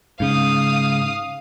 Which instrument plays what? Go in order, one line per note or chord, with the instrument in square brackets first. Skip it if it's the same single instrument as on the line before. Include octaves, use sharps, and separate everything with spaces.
[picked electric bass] G#2 C#3 [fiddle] F5 D#6